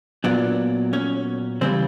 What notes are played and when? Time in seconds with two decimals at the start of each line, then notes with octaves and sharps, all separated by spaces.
0.24 A#2 F#3 B3 D4 D5
0.93 C#4 C#5
1.61 C#3 E3 G3 C4 C5